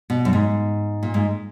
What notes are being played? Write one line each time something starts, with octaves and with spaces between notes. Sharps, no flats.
B2
F#2
G#2
A#2
G#2